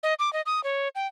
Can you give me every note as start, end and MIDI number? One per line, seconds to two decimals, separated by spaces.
0.03 0.14 75
0.19 0.32 86
0.33 0.41 75
0.46 0.63 87
0.64 0.88 73
0.95 1.07 79